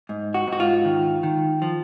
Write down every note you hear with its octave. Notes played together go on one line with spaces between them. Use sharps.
G#2
F#4
G#2
F#4
F4
D#3
D#3
F3